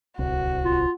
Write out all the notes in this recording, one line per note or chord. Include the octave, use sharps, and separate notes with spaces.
D1 C2 F#4
F4